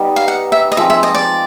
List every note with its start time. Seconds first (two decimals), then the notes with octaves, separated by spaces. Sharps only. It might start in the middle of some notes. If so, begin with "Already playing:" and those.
Already playing: G3 B3 D#4
0.16 F5
0.28 F#5
0.52 E5
0.72 D#5
0.77 F3 G#3 C4 E5
0.90 E5
1.03 D#5
1.15 D5